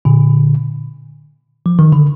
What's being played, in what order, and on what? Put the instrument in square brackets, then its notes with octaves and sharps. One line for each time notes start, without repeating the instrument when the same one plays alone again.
[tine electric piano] A#2 D3
F3
D#3
D3